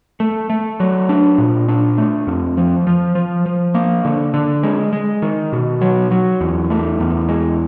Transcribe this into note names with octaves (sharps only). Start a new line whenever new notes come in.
A3
A3
F#3
D4
A#2
D4
A3
F2
F3
F3
F3
F3
A#3
D3
D3
G#3
G#3
D#3
B2
F#3
F#3
E2
A3
E2
G#3